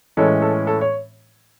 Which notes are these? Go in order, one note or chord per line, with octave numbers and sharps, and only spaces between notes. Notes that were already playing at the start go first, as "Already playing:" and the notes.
A2 E3 G#3 C#4 A4
A4
A4
C#5